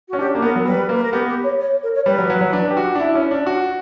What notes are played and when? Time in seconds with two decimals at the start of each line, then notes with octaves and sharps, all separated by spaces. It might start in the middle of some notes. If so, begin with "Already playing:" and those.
0.08 C#4 F#4
0.19 D4 G4
0.35 A#3
0.42 B3 A#4
0.56 F#3
0.65 G3 B4
0.89 A#3
0.95 B4
1.03 A#4
1.12 B3 G4
1.28 G4
1.43 C#5
1.60 C#5
1.83 A#4
1.94 C#5
2.06 G3 B4
2.18 F#3
2.30 F#3
2.41 F#3
2.53 D4
2.70 G4
2.77 F#4
2.95 D4
3.00 E4
3.15 C#4
3.31 D4
3.46 F#4